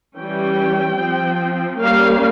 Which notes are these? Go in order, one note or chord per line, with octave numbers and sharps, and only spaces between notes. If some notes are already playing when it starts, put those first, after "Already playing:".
E3 G3 C#4 G5
F3 C4
G3 A#3 C#4 F5